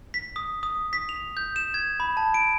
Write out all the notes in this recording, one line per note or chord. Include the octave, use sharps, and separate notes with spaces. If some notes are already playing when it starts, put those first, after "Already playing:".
B6
D#6
D#6
B6
F7
G6
E7
G#6
B5
A5
D7